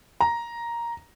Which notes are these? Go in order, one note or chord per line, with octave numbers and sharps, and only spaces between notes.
A#5